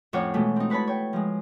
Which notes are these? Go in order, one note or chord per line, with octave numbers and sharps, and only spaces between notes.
F2 A2 C#4 C#5 F#5 D6
B2 E3 G#3 A3
C4 D#4
E4 B4 C#5 A5 B5
C#5 G5
F3 G#3